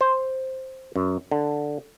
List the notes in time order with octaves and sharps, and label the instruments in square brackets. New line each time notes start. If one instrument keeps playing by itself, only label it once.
[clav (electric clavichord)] C5
F#2
D3